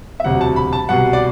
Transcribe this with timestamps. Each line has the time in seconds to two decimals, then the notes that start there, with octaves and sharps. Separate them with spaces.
0.20 E5
0.24 E1 D2 C3 F#3 F#5
0.41 A5
0.56 B5
0.73 A5
0.89 C2 B2 G3 F#5
1.13 D5